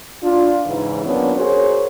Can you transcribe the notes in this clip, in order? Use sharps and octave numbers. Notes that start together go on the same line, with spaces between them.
D4 F4
G#2 C#3 E3
D#2 A#2 F#3 B3 C#4 D4
F#4 G#4 A#4 C5 C#5